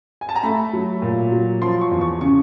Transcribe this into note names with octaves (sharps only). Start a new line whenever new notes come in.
G#5
A5
A#5
A3 B5
F#3
A#2
F#3
F3 C6
C#6
E2
C#6
C#3 C#6